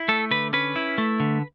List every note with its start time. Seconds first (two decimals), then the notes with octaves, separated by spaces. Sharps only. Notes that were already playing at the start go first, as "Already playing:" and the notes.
Already playing: E4
0.08 A3 A4
0.31 D3 B4
0.53 C#4 B4
0.76 E4
0.98 A3
1.20 D3